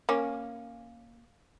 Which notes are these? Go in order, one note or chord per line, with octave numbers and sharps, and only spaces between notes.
A#3 C#4